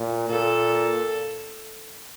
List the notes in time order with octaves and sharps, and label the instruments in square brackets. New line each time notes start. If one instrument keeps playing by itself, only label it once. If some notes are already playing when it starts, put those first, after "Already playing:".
Already playing: [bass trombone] A#2
[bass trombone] A#2 [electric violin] A4